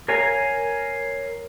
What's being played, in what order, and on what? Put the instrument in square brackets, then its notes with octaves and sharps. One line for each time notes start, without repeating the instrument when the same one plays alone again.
[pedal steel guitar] A#4 C#5 F5 G#5 A#5